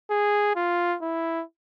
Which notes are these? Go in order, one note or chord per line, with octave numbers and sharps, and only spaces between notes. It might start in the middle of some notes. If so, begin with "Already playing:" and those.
G#4
F4
E4